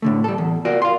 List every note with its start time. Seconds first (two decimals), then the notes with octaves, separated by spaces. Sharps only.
0.02 A2 D3 A3
0.24 G3 A4
0.38 E2
0.65 F4 F#4 A#4 D5
0.82 F5 C6